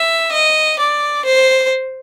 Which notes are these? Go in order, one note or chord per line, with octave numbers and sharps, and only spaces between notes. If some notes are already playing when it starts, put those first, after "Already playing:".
Already playing: E5
D#5
D5
C5